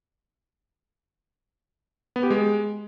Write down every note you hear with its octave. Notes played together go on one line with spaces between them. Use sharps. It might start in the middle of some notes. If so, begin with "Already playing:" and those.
B3
G4
G#3